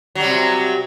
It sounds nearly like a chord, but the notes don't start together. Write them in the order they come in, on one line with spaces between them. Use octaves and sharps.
F#3 G3 C3